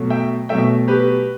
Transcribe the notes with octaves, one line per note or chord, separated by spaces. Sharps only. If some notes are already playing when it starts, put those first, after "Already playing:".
Already playing: B2 F#3 A3
E5 G5
B2 F#3 A3 E5 G5
G4 B4